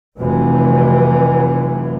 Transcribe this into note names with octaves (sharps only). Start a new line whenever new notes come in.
F1 C3 E3 F#3